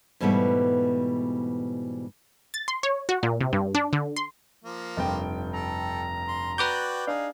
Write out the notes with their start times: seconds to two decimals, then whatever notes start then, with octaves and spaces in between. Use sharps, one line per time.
0.20 G#2 B2 E3 G3 A3 B3
2.54 A6
2.68 C6
2.83 C#5
3.09 F#4
3.23 A#2
3.41 C3
3.53 G2
3.75 D4
3.93 D3
4.16 C6
4.64 F3 A#3
4.97 F1 G2 G5
5.54 A4 A#5
6.28 C6
6.58 F#4 B4 D5 G5 D6 G6
7.07 D4 D#4 G#4 F5